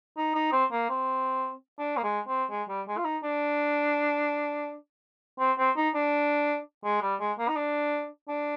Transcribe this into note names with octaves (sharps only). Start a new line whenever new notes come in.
D#4
D#4
C4
A#3
C4
D4
A#3
G#3
C4
G#3
G3
G#3
F4
D#4
D4
C4
C4
D#4
D4
G#3
G3
G#3
A#3
D#4
D4
D4